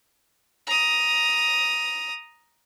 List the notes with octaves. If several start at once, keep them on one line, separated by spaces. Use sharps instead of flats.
A#5 D#6